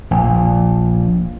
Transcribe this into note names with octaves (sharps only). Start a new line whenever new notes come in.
A#1